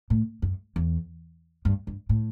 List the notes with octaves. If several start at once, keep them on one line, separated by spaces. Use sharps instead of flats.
A2
F#2
E2
G2
G2
A2